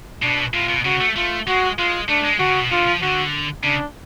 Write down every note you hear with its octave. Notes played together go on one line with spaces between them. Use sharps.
B2 D4
A2 F4
B2
C#3 F#4
A3
A3 F4
G#3 F#4
G#3 F4
A3 D4
G#3
D3 F#4
C#3
B2
D3 F4
F3
D3 F#4
C#3 D4